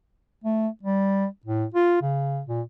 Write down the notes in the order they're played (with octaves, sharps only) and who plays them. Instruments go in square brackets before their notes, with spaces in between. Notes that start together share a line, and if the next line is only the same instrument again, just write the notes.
[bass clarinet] A3
G3
A2
F4
C#3
A#2